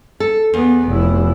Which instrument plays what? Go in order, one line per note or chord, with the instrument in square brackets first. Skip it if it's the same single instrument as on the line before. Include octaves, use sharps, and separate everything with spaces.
[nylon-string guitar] A4
[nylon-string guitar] E2 [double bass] B3
[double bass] F1 E4